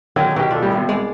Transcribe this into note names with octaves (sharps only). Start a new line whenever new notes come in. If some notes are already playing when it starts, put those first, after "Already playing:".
D3 D#3 F#3 G#4
B2 D#3 D#4 G4
D4 F4 A4
G#1 A2 G3
G#1 B2
C2 G#3 D5